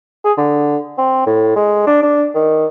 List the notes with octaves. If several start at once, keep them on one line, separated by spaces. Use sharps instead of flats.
G#4
D3
C4
A2
G#3
D4
D4
D#3